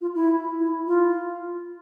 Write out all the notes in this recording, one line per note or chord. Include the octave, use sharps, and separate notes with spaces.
F4
E4
E4
F4